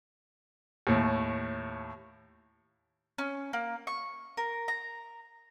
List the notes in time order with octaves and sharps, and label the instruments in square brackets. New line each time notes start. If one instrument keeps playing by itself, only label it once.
[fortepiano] D#2 A2
[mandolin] C#4
A#3
C#6
A#4
A#5